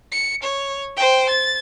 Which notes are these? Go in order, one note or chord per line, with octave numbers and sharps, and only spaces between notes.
C#7
C#5
C5 G5
A6